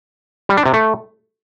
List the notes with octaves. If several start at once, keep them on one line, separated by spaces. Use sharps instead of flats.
G3
D4
C3
A3